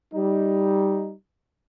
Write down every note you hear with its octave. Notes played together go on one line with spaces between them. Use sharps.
G3 D#4